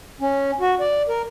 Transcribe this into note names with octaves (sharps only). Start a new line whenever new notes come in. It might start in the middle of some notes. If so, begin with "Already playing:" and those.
C#4
F#4
D5
A#4